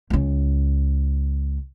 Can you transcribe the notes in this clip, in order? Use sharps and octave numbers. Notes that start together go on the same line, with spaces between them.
C#2 C#4